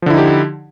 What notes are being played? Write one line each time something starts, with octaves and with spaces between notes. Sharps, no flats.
D3 F3 D#4 E4 G4